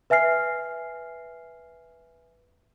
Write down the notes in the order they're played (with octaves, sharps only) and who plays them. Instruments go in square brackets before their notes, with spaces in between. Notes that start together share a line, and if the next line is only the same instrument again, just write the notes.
[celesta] B4 E5 G#5 F6 C7